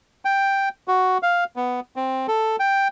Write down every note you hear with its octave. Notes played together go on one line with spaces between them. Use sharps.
G5
F#4
F5
B3
C4
A4
G5